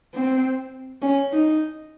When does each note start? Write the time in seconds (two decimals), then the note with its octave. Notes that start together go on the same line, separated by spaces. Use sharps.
0.14 C4
1.02 C#4
1.32 D#4